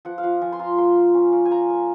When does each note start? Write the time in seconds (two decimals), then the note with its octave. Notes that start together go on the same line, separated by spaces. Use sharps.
0.05 F3 F#5
0.18 F5
0.23 F3 F#5
0.42 F3 G#5
0.52 C6
0.59 F4 A#5
0.78 A#3 C6
0.96 A#3
1.14 C#4
1.32 A#3
1.45 G#5
1.51 A#3 A#5
1.70 A#3